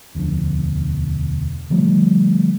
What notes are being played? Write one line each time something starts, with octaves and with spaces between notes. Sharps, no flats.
E1 D2 F3 D4
D3 F3 G3 A3